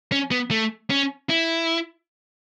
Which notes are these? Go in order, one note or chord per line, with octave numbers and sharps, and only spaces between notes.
C#4
B3
A3
C#4
E4